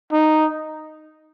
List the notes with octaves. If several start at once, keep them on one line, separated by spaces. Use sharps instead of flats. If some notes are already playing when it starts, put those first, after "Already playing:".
D#4